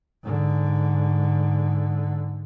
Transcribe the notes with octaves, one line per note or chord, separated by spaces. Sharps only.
G#2 D3